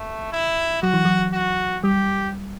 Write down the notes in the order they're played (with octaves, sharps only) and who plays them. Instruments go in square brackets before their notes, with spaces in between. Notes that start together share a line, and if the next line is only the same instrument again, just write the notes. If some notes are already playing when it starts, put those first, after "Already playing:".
Already playing: [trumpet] A3
E4
[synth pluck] F#3 [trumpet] F#4
[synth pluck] E3
F#3
[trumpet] F#4
[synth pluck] G3 [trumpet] G4